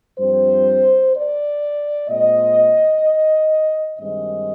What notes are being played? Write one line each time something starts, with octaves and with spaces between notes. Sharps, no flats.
G2 F3 C4 C5
D5
A#2 G#3 C4 D#5
G2 D#3 G#3 C4 D#5